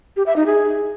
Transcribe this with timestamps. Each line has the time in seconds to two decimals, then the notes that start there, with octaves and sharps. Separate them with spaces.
0.16 G4
0.26 E5
0.36 D#4
0.46 G#4